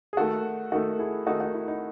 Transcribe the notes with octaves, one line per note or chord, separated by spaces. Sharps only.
G#4
D#3 A3 F#4 A4
D#3 A3 D#4 F#4
E4 G#4
D#3 A3 D#4 F#4
D#4 F#4
E4
D#4